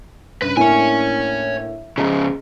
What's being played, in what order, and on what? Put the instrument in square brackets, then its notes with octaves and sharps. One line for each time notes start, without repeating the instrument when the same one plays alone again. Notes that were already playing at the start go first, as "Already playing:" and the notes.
[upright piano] G2 C#3 [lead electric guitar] B4
[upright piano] A2 A#3 D4 [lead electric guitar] C#5 G#5
[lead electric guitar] G#2 C#3 [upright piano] G#4 D#5 A#5